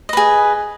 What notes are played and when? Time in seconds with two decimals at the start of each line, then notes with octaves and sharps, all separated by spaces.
0.09 D#5
0.13 B4
0.17 G#4